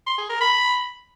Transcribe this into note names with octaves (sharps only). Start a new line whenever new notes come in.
C6
G#4
A#4
B5